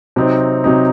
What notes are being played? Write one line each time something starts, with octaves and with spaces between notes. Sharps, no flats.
C3 F#3 C4 D#4
C3 F#3 C4 D#4